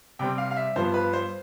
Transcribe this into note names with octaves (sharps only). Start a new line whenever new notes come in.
C3 G3 C4 G5
F5
F5
E5
G2 F3 B3 C5
B4
C5